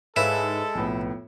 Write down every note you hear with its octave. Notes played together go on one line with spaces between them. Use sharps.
G#2 G#3 E4 A4 B4 C#5 F5
B1 F2 A2 B3